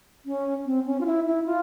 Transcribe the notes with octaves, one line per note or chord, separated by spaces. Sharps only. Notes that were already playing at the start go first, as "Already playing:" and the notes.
C#4
C4
C#4
F4
E4
E4
F4